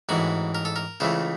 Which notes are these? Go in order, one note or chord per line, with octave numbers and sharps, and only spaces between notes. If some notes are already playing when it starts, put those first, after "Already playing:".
A1 G#2 E3 F#4
A#4
A4
A#4
C#2 C#3 E3 A3 C5